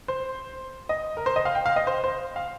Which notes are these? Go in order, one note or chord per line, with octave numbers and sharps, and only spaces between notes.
C5
D#5
A#4
C5
D#5
F5
G5
F5
D#5
C5
C5
F5